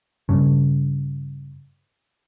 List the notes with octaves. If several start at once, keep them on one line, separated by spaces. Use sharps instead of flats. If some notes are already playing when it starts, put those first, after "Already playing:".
G2 C#3